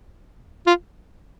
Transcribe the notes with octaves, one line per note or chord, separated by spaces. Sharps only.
F4